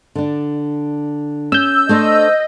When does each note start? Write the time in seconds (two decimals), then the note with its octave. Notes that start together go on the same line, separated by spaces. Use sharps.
0.15 D3 D4
1.52 C#4 E6 G6
1.89 A3 D4 C5 D#5